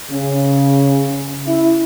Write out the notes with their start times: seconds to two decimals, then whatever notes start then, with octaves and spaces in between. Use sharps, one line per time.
0.11 C#3
1.46 E4